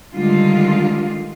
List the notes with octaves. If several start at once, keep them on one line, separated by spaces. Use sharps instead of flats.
D3 D#3 G3 G#3 F4